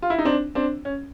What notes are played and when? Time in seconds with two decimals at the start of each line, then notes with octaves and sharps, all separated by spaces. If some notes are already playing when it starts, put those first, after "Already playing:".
0.02 F4
0.10 E4
0.19 D#4
0.25 C4 D4
0.55 C4 D4
0.85 C#4